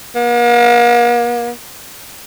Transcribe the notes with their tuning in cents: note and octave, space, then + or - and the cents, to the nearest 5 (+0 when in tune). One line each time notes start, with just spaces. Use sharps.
A#3 +45